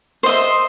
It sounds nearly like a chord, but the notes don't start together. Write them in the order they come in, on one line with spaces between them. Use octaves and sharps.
C5 D#5 E5